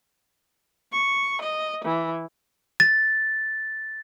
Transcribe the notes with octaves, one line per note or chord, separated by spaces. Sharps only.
C#6
D#5
E3
A6